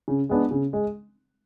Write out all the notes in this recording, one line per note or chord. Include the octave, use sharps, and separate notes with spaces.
C#3
G#3 B3 D4
C#3
G#3